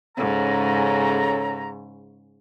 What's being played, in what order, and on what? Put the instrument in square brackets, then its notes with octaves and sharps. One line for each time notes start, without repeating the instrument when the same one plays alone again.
[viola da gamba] G#2 C#3 [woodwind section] C#4 A4 A#5